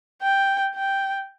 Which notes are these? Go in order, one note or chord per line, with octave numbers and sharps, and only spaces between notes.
G5
G5